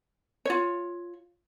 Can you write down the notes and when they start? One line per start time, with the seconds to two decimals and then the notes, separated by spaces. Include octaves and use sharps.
0.45 F4 C#5